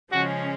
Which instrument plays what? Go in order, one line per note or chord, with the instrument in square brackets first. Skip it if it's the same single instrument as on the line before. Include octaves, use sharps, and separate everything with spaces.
[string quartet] C#3 F3 G#3 C#4 [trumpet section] F#4